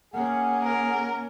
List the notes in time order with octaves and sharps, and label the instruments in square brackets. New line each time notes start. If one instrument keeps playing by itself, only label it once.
[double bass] A#3 C#4 [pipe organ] G#4 [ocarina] F#5
[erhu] A#4